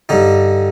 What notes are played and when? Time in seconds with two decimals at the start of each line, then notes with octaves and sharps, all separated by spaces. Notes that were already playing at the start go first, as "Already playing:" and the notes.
0.09 G2 D3 D#4